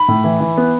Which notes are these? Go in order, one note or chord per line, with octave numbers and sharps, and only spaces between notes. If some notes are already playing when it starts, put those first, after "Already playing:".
Already playing: B5
A2
E3
E3
B3